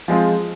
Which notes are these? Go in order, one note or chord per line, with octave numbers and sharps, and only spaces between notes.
F3 G#3 C4 F4